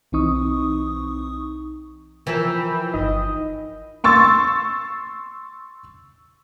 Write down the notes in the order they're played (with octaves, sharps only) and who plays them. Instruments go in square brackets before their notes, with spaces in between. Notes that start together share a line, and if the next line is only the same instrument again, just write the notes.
[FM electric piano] B1 E3 C4 D#4 C#6 D#6
[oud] E3 [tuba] F3 [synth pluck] A#4 G#5 E6 [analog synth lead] G5
[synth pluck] G1 D#4 [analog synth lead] D#5
[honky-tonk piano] C6 C#6 E6 A6